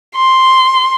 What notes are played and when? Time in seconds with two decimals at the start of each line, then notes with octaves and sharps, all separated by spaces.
0.16 C6